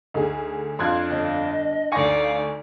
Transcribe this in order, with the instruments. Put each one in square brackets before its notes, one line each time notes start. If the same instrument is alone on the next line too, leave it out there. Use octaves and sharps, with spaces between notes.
[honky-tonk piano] D2 D3 G#4 [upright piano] D#4
[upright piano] F2 F4 F5 [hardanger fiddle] D4 [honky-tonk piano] C6 F#6 G#6
[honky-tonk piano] G1 [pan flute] D#5
[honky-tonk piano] D2 C#7 [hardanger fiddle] D#4 D5 [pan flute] F5 [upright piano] G#5 C#6 A#6